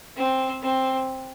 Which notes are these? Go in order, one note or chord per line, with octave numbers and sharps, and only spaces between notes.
C4
C4